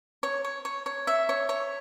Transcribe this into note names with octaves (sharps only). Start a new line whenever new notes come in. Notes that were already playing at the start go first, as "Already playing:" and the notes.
C#5
C#5
C#5
C#5
E5
C#5
C#5